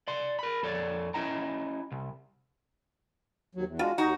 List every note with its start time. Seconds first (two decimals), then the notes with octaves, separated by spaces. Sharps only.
0.08 D5 C6
0.39 A#4 B5
0.63 F2 A4 C#5 D5
1.14 C#4 E4 D#5 G5 A#5
1.92 C2
3.55 D#2 F#3
3.67 E2
3.79 G#3 D4 F4 F#4
3.98 D#2 D#4 F#4 A#5